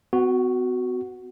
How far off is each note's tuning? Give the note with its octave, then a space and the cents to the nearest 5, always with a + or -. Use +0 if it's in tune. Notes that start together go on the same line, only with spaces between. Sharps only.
B3 +40 F#4 +0